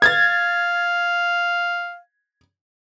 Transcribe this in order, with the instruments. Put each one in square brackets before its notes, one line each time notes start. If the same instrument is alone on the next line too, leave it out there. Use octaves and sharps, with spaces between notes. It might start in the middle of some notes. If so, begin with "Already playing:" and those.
[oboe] F5 [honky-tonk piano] G#6 A6